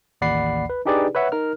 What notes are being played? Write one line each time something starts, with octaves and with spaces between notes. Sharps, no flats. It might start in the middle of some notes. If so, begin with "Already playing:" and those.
A1 D#2 D5 F#5 B5 C7
B4
D4 D#4 G4 G#4 B4 D5
B4 C#5 E5 F#5
D#4 A#4 F6